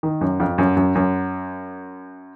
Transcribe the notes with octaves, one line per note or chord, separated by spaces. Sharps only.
D#3
F#2
F2
F#2
F#2
F#2